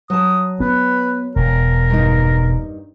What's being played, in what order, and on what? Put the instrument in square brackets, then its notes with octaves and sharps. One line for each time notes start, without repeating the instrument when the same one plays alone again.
[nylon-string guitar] F#3 A5 [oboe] D#6
[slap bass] B3 [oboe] B4
[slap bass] E1 [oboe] A#4
[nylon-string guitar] G2 A#3 D#4